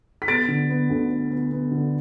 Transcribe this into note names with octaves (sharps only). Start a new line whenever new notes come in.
B6
B3 A6 D7
D3
B3
D2
B3
B3
B3
D3